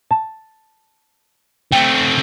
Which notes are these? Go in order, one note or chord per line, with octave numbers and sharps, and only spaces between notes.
A5
A3 C4 G5